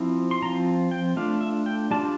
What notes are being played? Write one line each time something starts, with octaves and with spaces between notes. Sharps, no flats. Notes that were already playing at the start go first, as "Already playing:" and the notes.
Already playing: F3 C4 E4
C6
F3 C4 F4 A#5
G5
A3 D4 F4 F5
E5
G5
G3 D4 F4 A5